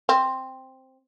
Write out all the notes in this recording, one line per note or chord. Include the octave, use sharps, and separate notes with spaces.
C4